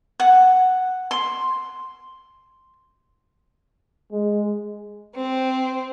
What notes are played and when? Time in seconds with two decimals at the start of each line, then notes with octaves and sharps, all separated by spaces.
0.20 F#5
1.11 C6
4.12 G#3
5.16 C4